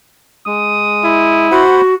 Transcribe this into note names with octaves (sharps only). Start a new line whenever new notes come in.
G#3 D#6
E4
F#4 C5 F#5 B5